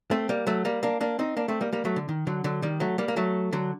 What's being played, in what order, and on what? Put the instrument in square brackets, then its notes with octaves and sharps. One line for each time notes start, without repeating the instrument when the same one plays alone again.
[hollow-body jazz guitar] A3 C4
G3 A#3
F#3 A3
G3 A#3
A#3 D4
A#3 D4
C4 D#4
A#3 D4
A3 C4
G3 A#3
G3 A#3
F#3 A3
D3
D#3
D3 F#3
D3 F#3
D#3 G3
F#3 A3
G3 A#3
A#3
F#3 A3
D3 F#3